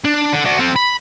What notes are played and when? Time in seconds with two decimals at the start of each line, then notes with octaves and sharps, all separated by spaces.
0.05 D4
0.33 D3
0.45 D4 F#4
0.59 C4 A4
0.76 B5